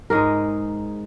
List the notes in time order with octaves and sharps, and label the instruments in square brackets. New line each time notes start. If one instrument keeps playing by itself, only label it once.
[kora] G#2 G#3 D#4 A#4